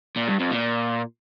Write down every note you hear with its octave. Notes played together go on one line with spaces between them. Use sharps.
A#2
G2
F2
A#2